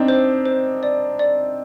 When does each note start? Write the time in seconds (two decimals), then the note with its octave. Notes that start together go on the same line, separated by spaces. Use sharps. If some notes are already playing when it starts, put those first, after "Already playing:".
Already playing: C4 D4 D#4
0.08 C5
0.45 C5
0.83 D5
1.19 D5